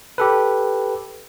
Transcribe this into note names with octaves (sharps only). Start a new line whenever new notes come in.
G4 A4 B4